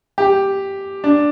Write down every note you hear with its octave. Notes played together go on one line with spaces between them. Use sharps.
G4
D4